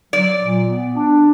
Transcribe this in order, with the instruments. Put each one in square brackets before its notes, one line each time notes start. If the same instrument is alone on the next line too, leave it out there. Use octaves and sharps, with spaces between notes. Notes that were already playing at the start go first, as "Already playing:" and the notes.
[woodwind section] F#3 [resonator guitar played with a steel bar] D5
[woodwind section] A#2
B3
D4